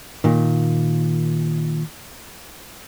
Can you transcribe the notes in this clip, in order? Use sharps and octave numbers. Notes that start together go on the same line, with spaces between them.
A#2 D#3